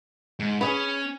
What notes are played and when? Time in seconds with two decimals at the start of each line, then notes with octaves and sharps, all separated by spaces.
0.39 G#2
0.61 C#4 G#4 B4